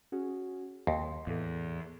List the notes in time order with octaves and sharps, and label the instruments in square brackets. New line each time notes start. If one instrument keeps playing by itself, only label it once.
[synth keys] C#4 F#4 G#4
[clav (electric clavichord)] D#2 [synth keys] C6
[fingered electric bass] E2 [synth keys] A2 A4